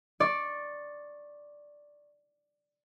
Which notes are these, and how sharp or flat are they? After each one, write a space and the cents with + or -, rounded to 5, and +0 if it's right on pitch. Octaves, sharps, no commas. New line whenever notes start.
D5 +0 C#6 -20